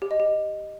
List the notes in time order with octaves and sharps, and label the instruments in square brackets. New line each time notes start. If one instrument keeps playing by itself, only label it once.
[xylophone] G4
D#5
G4